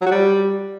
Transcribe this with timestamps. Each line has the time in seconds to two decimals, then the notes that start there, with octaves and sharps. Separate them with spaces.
0.01 F#3
0.06 F#4
0.11 G3